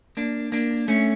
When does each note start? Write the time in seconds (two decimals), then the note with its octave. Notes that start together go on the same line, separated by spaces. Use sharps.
0.17 A#3 D4
0.52 A#3 D4
0.88 A3 C#4